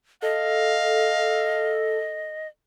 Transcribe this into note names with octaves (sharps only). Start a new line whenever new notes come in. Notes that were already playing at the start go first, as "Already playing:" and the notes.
A4 D#5 F5